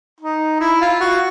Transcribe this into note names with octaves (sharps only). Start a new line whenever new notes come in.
D#4
E4
F4
F#4